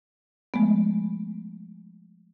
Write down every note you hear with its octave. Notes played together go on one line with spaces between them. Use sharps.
F3 G#3 A3 B3